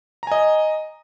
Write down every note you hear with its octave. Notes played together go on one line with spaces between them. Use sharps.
D#5 G#5 A#5